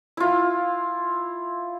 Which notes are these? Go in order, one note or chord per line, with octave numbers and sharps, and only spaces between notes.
E4 F4